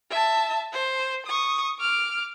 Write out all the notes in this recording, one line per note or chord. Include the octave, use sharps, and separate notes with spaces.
E5 A5
C5
C#6 D#6
D6 F6